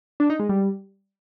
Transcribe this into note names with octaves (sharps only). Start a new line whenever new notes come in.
D4
D#4
G#3
G3